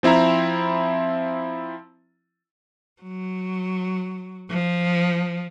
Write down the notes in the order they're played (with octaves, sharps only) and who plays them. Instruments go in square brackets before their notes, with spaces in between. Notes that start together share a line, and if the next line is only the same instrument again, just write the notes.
[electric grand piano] F3 C4 E4 E5 A#5
[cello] F#3
F3